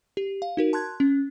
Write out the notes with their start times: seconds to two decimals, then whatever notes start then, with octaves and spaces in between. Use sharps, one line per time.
0.17 G4
0.42 F5
0.57 D#4 F#4 A#4
0.73 A5 C6 F#6 G#6
1.00 C#4